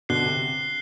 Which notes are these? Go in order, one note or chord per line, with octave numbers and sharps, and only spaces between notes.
B2 D3 F#6 C7 G7
C3